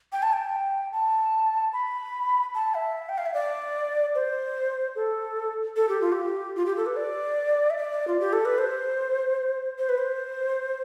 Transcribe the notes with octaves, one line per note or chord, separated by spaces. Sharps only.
G5
A5
G5
A5
B5
A5
E5
G5
F5
E5
D5
C5
A4
A4
G4
F4
G4
F4
G4
A4
B4
D5
E5
D5
F4
G4
A4
B4
C5
C5
B4
C5